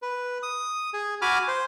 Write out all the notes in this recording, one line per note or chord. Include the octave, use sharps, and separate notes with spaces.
B4
D#6
G#4
F#4 G#5 B5 D6 F6
C5